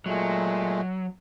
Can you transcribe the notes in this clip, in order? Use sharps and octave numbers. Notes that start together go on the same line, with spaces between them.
A#2 F#3 G#3 A3